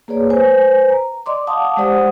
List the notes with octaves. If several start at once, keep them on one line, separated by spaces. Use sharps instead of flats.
A#3 G#4 B4 C#5 D5
B4 C5 G#5
A#5
D5 D#5 C6 D6
F5 F#5 A5 D6 D#6
G#3 G4 C5 D5 F#5 D#6